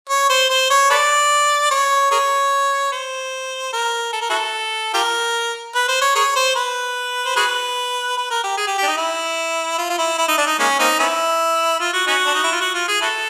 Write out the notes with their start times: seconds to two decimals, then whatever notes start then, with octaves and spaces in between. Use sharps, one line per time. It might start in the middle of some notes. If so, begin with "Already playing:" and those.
0.09 C#5
0.30 C5
0.50 C5
0.70 C#5
0.90 A4 B4 D5
1.71 C#5
2.11 G#4 A#4 C#5
2.92 C5
3.73 A#4
4.13 A4
4.21 A#4
4.30 E4 F#4 A4
4.94 F4 G4 A#4
5.75 B4
5.88 C5
6.01 C#5
6.15 G#4 A#4 C#5
6.36 C5
6.55 B4
7.25 C5
7.36 F#4 G#4 B4
8.17 B4
8.30 A#4
8.44 G4
8.57 G#4
8.67 G4
8.78 G4
8.83 D4
8.87 D#4
8.97 E4
9.78 F4
9.90 F4
9.98 E4
10.19 E4
10.28 D#4
10.38 D4
10.47 D#4
10.59 G#3 A#3 C#4
10.79 A#3 C4 D#4
10.99 B3 C#4 E4
11.80 F4
11.93 F#4
12.07 C#4 D#4 F#4
12.26 D4
12.34 D#4
12.44 E4
12.52 F4
12.61 F#4
12.74 F4
12.88 G#4
13.02 E4 F#4 A4